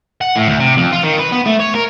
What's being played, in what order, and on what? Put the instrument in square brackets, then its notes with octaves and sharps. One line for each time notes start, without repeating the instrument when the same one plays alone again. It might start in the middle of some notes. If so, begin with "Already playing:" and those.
[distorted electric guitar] F#5
A2
D2
C3
F2
F4
D#3
B4
B3
A3
C#5
A#4